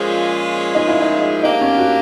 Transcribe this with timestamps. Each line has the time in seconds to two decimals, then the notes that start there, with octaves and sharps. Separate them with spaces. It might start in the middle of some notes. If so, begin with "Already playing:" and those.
Already playing: A#2 F3 G#3 C#4 F4
0.75 D#4
0.89 E4
1.01 D#4
1.43 F#3 A#3 D4 D#4 G4
1.61 C#4
1.78 F#4